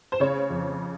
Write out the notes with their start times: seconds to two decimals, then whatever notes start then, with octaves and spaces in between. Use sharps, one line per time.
0.12 C5
0.20 C#3 C#5
0.50 F2